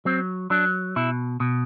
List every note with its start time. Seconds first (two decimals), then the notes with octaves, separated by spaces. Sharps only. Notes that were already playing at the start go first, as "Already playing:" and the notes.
0.05 F#3 C4
0.50 F#3 D4
0.96 B2 E4
1.40 B2